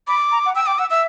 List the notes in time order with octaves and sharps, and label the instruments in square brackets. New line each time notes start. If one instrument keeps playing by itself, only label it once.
[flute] B5 [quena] D6
[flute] A#5
F#5
[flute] G5 [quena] E6
[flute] G5 [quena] D6
[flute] F#5 [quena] E6
[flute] E5 [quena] E6